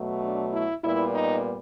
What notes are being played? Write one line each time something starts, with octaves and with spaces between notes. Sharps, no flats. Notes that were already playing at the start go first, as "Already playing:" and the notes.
Already playing: B2 F#3 A3
D4
E4
A#2 G3 B3 E4
D#4